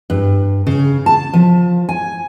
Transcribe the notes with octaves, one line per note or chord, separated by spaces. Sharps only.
G2
C#3
A5
F3
G#5